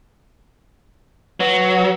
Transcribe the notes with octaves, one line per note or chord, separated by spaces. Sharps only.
F#3 B4